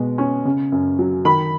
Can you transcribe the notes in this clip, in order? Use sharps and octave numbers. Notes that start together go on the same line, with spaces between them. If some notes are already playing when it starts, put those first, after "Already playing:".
Already playing: B2 G#3
C#4
C#3
F#2
F#3
D#3 B5